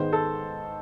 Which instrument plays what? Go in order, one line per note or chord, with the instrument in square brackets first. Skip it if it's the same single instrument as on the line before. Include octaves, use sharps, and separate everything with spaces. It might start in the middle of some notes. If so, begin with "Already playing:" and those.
Already playing: [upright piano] G#2 D#3 G#3 B3 C5
A4